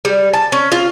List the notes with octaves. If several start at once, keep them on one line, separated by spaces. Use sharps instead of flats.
G3
A5
C#4
F4